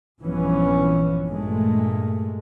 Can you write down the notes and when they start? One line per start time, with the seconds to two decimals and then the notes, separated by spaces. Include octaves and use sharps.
0.22 A#1 G2 E3 F3 B3 C#4
1.28 G2 A#2 G#3 A3